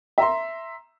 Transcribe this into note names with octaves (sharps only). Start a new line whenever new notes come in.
E5 A#5 C6